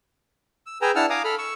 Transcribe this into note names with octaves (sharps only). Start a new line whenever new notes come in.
E6
G#4 B4 G5 G#5 A#5 E6
D4 E4 F#5 A5 E6 F6
F5 G#5 A#5 D6 D#6
A4 B5 F6
C#6 E6